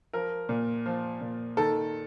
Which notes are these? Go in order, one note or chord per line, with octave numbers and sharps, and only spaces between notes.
F3 A#4
A#2
F3
A#2
D#3 A4